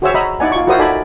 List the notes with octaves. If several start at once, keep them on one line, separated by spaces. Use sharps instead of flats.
F#4 G#4 C5 C#5 E5 E6
D#5 E5 A#5 B5
D#4 E4 D5 F#5 G#5
F4 C#6
E4 F#4 A#4 C5 D5 D#6
D#4 A4 D5 G#5 B5